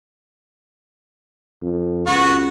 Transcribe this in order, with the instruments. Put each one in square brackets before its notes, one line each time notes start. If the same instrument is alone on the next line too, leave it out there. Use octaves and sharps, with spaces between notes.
[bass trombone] F2
[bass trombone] C#2 [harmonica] B3 F#4 C#6